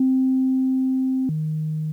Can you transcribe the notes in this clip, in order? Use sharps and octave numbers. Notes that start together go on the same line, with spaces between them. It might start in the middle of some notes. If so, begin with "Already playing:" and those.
Already playing: C4
D#3